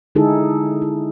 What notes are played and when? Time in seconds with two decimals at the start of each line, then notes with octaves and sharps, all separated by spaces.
0.15 D3 G#3 D#4 E4 G#4 A4
0.82 E4